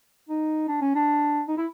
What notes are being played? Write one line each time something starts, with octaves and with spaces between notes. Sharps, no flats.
D#4
D4
C#4
D4
D#4
E4